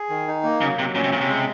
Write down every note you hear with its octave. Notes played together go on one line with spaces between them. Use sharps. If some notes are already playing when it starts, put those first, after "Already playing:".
Already playing: G#4
D#3
D#4
A#3
C#3 F#3
C3 F#3
A#2 C#4
C3
A#2 C#3
C3
G#3